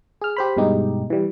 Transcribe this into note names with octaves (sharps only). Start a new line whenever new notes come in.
G#4 F6
G4 C5 B5
G2 B2 G#3 D#4 G4
E3 G3